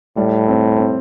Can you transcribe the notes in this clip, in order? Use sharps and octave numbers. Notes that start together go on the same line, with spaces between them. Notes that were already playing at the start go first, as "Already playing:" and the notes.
A2 G3
C4
C4